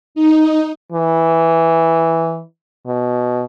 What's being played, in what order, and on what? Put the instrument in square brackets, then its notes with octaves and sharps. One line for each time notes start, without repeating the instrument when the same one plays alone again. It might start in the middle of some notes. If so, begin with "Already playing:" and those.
[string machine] D#4
[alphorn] E3
B2